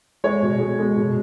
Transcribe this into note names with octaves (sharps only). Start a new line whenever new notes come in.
G#3 C#5
B2
G#3
G#3
B2